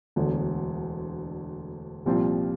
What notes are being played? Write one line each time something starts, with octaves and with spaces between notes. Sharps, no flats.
E1 D2 D3
C2 A#2 F3 C4 F4